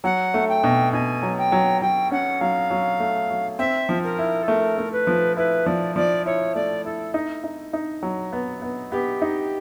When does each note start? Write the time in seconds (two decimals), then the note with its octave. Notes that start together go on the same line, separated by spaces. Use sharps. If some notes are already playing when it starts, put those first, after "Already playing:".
0.04 F#3 F#5
0.34 A3
0.49 G5
0.63 B2
0.93 B2 G#5
1.23 F#3
1.38 G5
1.52 F#3
1.82 F#3 G5
2.11 C#4 F#5
2.41 F#3 F5
2.70 F#3
3.00 A3
3.30 F#3
3.59 C4 E5
3.89 F3
4.03 A#4
4.18 E4
4.43 A4
4.48 A3 A#4
4.78 A3
4.92 B4
5.07 F3
5.37 E4 B4
5.66 F3 D5
5.96 F3 D5
6.26 E4 C#5
6.55 A3 D5
6.85 E4 A4
7.14 D#4
7.44 D#4
7.73 D#4
8.03 F#3
8.33 B3
8.62 B3
8.92 B3 G4
9.22 D#4